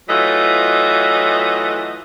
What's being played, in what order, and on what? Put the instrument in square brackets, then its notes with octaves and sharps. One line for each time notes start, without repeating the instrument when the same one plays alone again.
[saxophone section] E3 F#3 A3 F4 D#5